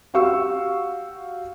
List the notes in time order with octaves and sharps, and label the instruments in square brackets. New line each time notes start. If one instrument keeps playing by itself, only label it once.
[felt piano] F#4 G4 F5 C#6 E6